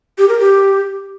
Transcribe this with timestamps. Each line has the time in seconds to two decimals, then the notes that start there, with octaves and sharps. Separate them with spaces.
0.18 G4
0.29 A#4
0.39 G4